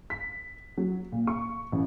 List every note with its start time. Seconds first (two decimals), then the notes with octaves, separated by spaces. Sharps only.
0.10 B6
0.78 F#3
1.12 A#2
1.27 C#6
1.72 A1